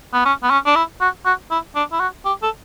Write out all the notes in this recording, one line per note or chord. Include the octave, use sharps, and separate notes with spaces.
B3
C#4
B3
C#4
D4
E4
F#4
F#4
E4
D4
E4
F#4
G4
A4